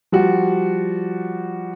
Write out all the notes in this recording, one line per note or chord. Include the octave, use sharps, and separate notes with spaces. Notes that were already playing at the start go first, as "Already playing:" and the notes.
F3 G3 F#4